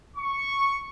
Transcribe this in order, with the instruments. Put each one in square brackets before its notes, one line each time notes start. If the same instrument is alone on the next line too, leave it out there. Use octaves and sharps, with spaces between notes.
[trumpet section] C#6